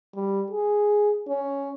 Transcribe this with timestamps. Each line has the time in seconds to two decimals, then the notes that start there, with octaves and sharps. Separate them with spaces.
0.15 G3
0.51 G#4
1.28 C#4